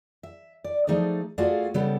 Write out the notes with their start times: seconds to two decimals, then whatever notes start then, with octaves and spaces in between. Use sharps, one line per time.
0.23 E5
0.64 D5
0.87 F3 A3 D#4 G#4 D5
1.38 A3 F4 F#4 G#4 D5 F5
1.74 C#3 G3 B3 G4 A4